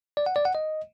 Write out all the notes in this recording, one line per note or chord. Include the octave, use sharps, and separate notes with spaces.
D5
F#5
D5
F#5
D#5